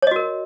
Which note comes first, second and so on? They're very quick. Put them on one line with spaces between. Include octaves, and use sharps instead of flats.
C#5 D#5 F#4 A#4